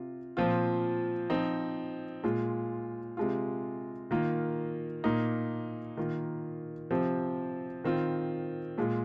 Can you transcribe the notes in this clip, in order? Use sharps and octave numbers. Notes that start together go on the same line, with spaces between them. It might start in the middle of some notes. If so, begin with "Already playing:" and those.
Already playing: C3 F4
A#2 F3 C4 F4
F3 C4 D#4
A#2 G#3 F4
C3 G#3 F4
D#3 A#3 F4
A#2 A#3 D#4
D#3 A#3 F4
C3 F3 C4
D#3 C4 F4
A#2 G#3 F4